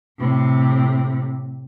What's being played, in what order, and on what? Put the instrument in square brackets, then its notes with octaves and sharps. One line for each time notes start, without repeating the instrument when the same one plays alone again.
[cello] A2 C3